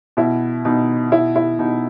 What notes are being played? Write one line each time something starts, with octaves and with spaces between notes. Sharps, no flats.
B2 E4
B2 D#4
B2 E4
E4
B2 D#4